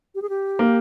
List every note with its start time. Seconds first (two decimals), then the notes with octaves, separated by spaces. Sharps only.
0.15 G4
0.22 G#4
0.29 G4
0.59 A#3